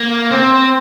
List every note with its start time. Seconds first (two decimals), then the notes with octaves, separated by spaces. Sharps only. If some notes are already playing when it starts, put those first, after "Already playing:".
Already playing: A#3
0.31 C4